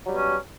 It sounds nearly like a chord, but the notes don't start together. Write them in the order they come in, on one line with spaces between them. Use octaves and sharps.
F#3 G3 B2 C#4